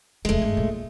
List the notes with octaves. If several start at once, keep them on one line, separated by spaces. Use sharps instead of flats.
E1 F3 G#3 A3
G1 E2
A#1 A#2